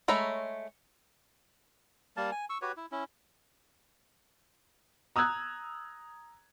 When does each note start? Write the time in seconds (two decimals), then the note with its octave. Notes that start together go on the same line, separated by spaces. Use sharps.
0.08 G#3 A3 C#5 A#5 B5
2.17 G3 A#3 A#4 A5
2.32 G#5
2.50 C#6 E6
2.62 F#4 G4 B4 C#5
2.77 E4
2.92 C#4 E4
5.16 A#5 D#6 E6 F#6 G#6